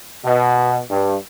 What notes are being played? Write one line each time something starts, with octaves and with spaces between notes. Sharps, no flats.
B2
G2